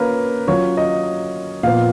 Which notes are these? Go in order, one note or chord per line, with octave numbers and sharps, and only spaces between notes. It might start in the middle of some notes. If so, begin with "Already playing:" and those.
Already playing: A#3 C#4 F4 A#4 B4
F#3 C#4 F4 C#5
D#5
A#2 F3 B3 F5